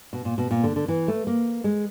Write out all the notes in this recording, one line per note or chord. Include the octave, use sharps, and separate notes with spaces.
B2
A#2
B2
A#2
D3
D3
E3
A3
A#3
G#3